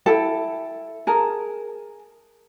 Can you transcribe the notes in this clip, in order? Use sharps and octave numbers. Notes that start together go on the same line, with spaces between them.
E4 A4 G5
G#4 A#4 A5